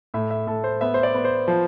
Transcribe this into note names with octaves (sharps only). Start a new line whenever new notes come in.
A2 E5
E5
A2 A4
C5
B3 E5
C5
D5
B3
C5
F3